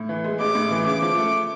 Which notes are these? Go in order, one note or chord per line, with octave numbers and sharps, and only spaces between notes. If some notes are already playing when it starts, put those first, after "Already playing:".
Already playing: A2
E3
G#3
A1 D6
A2
E3
C#3 D6
F3
A3